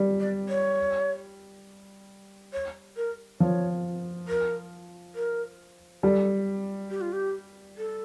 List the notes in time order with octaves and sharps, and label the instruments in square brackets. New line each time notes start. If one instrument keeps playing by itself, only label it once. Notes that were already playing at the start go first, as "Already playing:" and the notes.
Already playing: [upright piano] G3
[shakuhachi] D5
C#5
C#5
A#4
[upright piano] F3 [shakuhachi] C#5
[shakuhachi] A#4
A#4
[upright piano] G3 [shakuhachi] A4
[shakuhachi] G4
F4
G4
A4